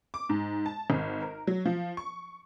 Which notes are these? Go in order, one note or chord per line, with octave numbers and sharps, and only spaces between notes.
D6
G#2
A5
G#1
A#4
F#3
F3
C#6